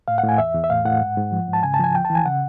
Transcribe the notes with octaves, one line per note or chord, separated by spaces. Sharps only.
A2 F5
F#5
A2 G#5
E2 E5
E2
E5
A2 F5
A2 F#5
G#2
G#2
F3
G#2
A5
C#3 G#5
A5
F3 G#5
D2 G5
A5
E3
G#5
C#3 F#5